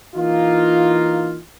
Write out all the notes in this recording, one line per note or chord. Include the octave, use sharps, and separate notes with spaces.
E3 A#3 D#4 F4